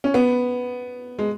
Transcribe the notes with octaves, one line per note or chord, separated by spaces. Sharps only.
C#4
B3
G#3